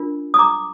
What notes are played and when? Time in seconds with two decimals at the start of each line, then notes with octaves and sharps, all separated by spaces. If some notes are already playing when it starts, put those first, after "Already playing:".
Already playing: D4 F4 A#4
0.34 D#6
0.39 A#5 D6